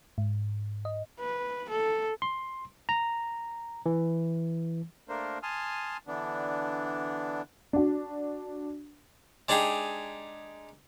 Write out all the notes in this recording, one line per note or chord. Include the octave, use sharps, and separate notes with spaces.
G#2
D#5
B4
A4
C6
A#5
E3
A3 A#3 D4 A#4 C5
G#5 A5 C6 D#6 F6
D3 E3 B3 D4
D4 F#4
G#3 D4 D#4 G4 G#4